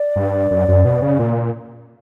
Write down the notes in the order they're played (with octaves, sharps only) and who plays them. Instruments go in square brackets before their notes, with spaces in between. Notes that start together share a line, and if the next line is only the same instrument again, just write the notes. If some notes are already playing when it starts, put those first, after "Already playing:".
Already playing: [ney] D5
[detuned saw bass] G2
F#2
F#2
B2
C#3
A#2